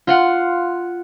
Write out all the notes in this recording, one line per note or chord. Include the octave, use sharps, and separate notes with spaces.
F4 F5 F#5